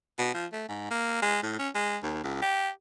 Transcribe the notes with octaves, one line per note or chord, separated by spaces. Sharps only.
B2
F3
A3
G#2
A#3
G#3
A2
C#4
G#3
D#2
C#2
G4